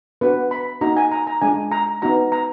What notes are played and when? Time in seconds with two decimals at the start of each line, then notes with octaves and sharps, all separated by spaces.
0.21 B3 D4 F#4 B4
0.51 B5
0.81 A#3 D#4 F#4 A#5
0.97 G#5
1.12 A#5
1.27 A#5
1.41 G#3 D4 F4 G#5
1.72 A#5
2.02 B3 D#4 F#4 A#5
2.32 A#5